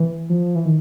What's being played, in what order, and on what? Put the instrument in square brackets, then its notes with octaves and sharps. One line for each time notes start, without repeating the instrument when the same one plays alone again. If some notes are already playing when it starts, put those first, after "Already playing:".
Already playing: [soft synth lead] E3
F3
E3
D#3